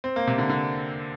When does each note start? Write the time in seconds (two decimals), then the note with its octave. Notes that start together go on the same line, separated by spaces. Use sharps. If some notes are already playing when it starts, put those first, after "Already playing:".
0.04 C4
0.16 A#3
0.27 C3
0.38 D3
0.49 D3